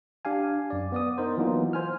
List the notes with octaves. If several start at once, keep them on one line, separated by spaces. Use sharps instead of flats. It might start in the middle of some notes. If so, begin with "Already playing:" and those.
D4 G4 F5 G#5
F#2 D5
B3 D5 D#6
B3 D#4 A#4 C5
E3 F#3 A#3 B3 D#4 F4
C5 G#5 F6